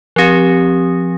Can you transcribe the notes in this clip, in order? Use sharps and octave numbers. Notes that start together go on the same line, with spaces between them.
F3 C4 G4